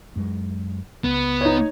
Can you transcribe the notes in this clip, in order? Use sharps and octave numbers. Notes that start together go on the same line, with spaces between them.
F#2 G#3
C#2 B3
D#4 C#5